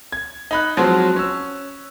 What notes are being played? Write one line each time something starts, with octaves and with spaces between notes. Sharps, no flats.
G#6
D#4 B5 F#6
F3 F#3 G#3 C4 F#4
C#4 E6